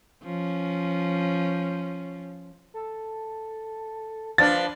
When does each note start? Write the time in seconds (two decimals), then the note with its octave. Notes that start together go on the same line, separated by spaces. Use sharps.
0.24 F3 C#4
2.74 A4
4.38 F3 D4 B4 F5 A6